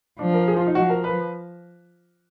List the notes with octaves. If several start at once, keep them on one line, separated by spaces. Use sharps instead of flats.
F3 D4
A#4
G#4
F4
D#4
F3 F#4
A#4
B4